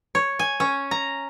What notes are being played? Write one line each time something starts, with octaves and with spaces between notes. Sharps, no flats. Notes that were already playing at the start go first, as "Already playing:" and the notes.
C#5
G#5
C#4
A#5